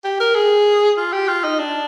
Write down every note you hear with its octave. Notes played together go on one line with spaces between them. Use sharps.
G4
A#4
G#4
F4
G4
F4
D#4
D4